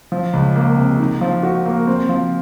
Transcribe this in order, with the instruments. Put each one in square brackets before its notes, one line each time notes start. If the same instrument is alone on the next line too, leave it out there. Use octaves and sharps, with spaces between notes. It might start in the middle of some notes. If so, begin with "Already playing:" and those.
[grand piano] F3
C#2
A#3
C3
D#4
F3
F#4
A#3
C4
F3